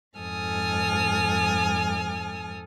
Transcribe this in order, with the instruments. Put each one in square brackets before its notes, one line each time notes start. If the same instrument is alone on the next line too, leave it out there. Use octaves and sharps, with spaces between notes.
[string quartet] F2 G#2 A4 G#5 D#6 F6